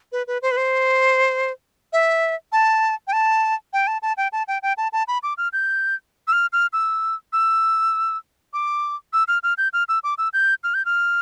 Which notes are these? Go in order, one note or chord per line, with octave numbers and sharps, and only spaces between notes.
B4
B4
C5
B4
C5
E5
A5
G5
A5
G5
A5
A5
G5
A5
G5
G5
A5
A5
B5
D6
F6
G6
E6
F6
F6
E6
E6
D6
E6
F6
F6
G6
F6
E6
D6
E6
G6
F6
G6
F6